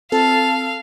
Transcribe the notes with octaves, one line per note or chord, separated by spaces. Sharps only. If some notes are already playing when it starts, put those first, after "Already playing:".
C4 F4 A4 F5 A5